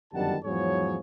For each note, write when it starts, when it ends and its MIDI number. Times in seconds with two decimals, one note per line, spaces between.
0.13 0.36 31
0.13 0.36 42
0.13 0.36 51
0.13 0.36 55
0.13 0.36 78
0.13 0.36 81
0.44 0.98 40
0.44 0.98 44
0.44 0.98 53
0.44 0.98 54
0.44 0.98 68
0.44 0.98 73